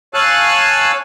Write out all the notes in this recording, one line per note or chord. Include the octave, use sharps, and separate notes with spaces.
C#5 F5 G#5 A5 E6 F#6